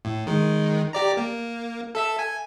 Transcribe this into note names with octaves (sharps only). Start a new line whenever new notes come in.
A2
D#3 G#3
G4 D5 A#5
A#3
A4 E5 E6
G#5